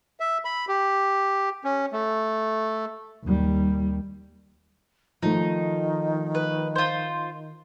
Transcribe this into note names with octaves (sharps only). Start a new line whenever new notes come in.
E5
B5
G4
C#4
A3
D#2 G3
D#3 F3 A3 D#4
B4
F4 C5